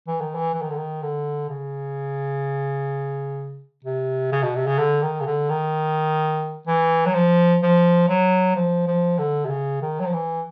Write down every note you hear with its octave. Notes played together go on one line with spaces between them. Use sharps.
E3
D#3
E3
E3
D#3
D3
D#3
D3
C#3
C3
C#3
B2
C3
C#3
D3
D#3
C#3
D3
D#3
E3
F#3
F3
F3
F#3
F3
F3
D3
C3
C#3
D#3
F#3
F3
E3